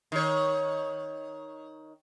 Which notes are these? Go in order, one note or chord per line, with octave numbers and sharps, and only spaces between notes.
D#3 C#5